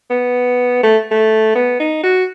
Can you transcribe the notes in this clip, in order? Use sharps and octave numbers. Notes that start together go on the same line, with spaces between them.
B3
A3
A3
B3
D#4
F#4